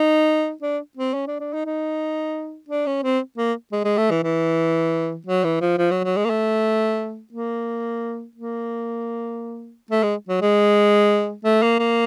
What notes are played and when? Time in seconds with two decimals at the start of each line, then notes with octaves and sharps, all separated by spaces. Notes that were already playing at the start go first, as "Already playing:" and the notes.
Already playing: D#4
0.62 D4
0.97 C4
1.14 C#4
1.27 D4
1.40 D4
1.53 D#4
1.66 D#4
2.68 D4
2.86 C#4
3.03 C4
3.37 A#3
3.72 G#3
3.84 G#3
3.98 A3
4.11 E3
4.24 E3
5.26 F#3
5.44 E3
5.61 F3
5.78 F3
5.91 F#3
6.04 F#3
6.17 G#3
6.25 A#3
6.30 A3
7.33 A#3
8.36 A#3
9.91 A3
10.03 G#3
10.29 F#3
10.41 G#3
11.44 A3
11.62 A#3
11.79 A#3